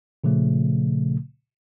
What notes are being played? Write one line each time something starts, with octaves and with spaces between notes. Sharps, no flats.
A#2 C#3 F3 A3